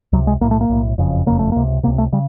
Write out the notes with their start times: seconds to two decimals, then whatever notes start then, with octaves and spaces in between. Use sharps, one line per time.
0.13 C#2 C3 F#3
0.27 G#3
0.41 B1 A#3
0.44 A2
0.51 A3
0.61 A#3
0.69 B1 A2
0.98 F#1 F2 C#3
1.26 F#1 F2 C#3 A#3
1.39 A3
1.52 C#2 C3 A#3
1.83 C3 A#3
1.87 C#2
1.98 A3
2.12 C#3 G3